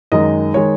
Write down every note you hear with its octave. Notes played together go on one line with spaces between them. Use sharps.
F#2 D#3 G#3 D#5
D#3 G#3 C#5